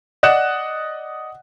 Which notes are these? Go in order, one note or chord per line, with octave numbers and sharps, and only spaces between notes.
D5 D#5 F#5 F#6 E7